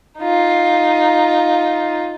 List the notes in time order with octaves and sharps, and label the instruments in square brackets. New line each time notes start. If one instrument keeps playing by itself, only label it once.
[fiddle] D#4 F4